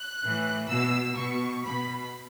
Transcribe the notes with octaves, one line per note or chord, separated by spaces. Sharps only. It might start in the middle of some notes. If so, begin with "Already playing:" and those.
Already playing: F#6
A2 E3
B2 E6
B2 C#6
B2 B5